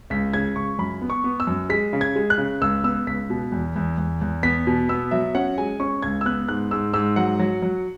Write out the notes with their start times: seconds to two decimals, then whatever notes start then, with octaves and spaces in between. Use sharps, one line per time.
0.10 C#2 B6
0.33 C#3 G#6
0.56 C#2 C#6
0.79 F#2 B5
1.02 B3
1.10 C#6
1.24 B3
1.40 E6
1.47 F#2
1.69 G#3 B6
1.93 C#3
2.01 G#6
2.16 G#3
2.30 F#6
2.38 C#3
2.61 C#2 E6
2.84 B3 E6
3.07 C#2 B6
3.30 B2
3.52 E2
3.76 E2
3.98 E2
4.21 E2
4.43 B3 B6
4.67 B2
4.89 B3 E6
5.11 F#3 E5
5.35 C#4 F#5
5.58 G#3 G#5
5.80 C#4 C#6
6.02 C#2 G#6
6.21 E6
6.25 B3 F#6
6.48 G#2 F#6
6.71 G#2 E6
6.94 G#2 E6
7.16 F#3 F#5
7.39 F#3
7.62 F#3